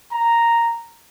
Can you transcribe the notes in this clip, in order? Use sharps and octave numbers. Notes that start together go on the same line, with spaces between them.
A#5